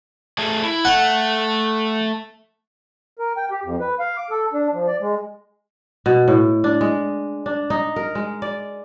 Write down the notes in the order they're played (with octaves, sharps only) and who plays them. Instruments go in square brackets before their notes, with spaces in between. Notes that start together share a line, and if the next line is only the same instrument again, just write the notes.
[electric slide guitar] A3 G#4 A4
E4
[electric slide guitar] A3 [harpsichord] F#5
[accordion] A#4
G5
G4
F2
B4
F5
D6
A4
D4
F3
D5
G#3
[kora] B2
A2
D4
G#3
D4
D#4
A#4
G#3
D5